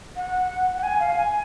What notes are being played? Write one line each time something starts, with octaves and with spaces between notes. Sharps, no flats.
F#5
F#5
G#5
F5
G#5